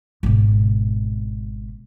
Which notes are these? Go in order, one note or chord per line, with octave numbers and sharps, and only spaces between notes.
G#1 B2